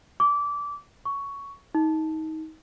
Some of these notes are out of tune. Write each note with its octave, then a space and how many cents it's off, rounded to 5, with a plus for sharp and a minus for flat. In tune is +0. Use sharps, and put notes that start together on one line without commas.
D6 -20
C#6 +10
D#4 +25